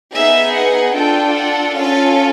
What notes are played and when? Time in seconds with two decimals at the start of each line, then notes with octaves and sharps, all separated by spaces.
0.13 B3 D#4 G#4 E5
0.53 F#5
0.94 D4 F4 A4 G5
1.35 F#5
1.77 C#4 F4 A4 F5